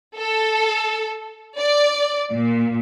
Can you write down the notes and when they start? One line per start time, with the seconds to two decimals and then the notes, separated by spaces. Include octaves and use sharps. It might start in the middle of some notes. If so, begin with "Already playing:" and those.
0.17 A4
1.58 D5
2.32 A#2